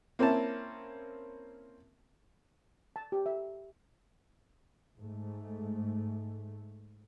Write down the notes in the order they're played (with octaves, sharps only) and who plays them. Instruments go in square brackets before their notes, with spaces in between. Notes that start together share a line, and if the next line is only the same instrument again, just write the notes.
[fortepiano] A#3 C4 C#4 E4 A5
[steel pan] A5
G4
E5
[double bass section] G#2 A3